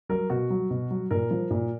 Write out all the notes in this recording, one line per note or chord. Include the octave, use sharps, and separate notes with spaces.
F#3 A#4
B2 F#4
F#3
B2
F#3
A#2 A#4
F3
A#2